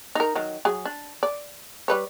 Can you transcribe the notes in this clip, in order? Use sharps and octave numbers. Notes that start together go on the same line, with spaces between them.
D#4 A#4
D#3 F#3
F#3 G#4
D4
D5
G3 B4 C#5